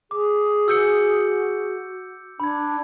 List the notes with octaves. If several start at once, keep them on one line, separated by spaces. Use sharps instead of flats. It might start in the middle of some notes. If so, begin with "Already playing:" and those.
G#4 D6
F#4 E6 G6 C#7
D4 B5 G#6